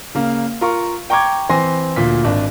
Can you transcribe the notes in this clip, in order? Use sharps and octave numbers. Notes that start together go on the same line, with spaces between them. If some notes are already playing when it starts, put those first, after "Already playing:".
C#3 A#3
F4 A#4 C#6
G5 A#5 C#6 D6 G#6
E3 C4 G#5 C6 A#6
D2 A#2 B6
G#1 D4